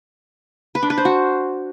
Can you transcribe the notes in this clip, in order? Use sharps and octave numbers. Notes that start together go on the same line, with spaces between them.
B4
D4
B4
C5
F#4